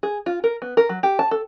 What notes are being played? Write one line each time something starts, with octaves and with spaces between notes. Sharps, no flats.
G#4
F4
A#4
B3
A#4
F#3
G4
A5
A4